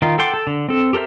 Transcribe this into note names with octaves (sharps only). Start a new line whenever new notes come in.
D#3 D#4 F4
A4 F#5 G5 C6 D6
A4
D3
C4 A4
G4 A4 A#4 C5 E5